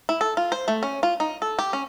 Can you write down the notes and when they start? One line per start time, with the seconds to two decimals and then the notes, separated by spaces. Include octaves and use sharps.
0.09 E4
0.21 A4
0.37 F4
0.52 C5
0.68 A3
0.83 C#4
1.03 F4
1.20 D#4
1.42 A4
1.59 G4
1.73 C#4